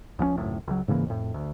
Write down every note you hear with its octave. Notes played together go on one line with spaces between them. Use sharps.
C#2 F3 G3 C#4
G#1 C#2 F#2 A2
C#2 F#3
G#2 C#3 E3 A#3
F2 A2
D2